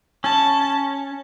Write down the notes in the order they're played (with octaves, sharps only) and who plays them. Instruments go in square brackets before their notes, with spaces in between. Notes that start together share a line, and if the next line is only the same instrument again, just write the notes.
[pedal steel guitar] C#4 [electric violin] A5